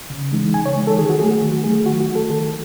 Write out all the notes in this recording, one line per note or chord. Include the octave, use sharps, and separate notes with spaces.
C#3
E3 G#3 D#4
C#3 G#5
C#5
E3 G#3 D#4
A4
D#3 G#4
F#4
F#3 A3 G#4
F#4
D#3
F#3 A3 G#4
D#3 F#4
F#4
F#3 A3
A4
D#3 A4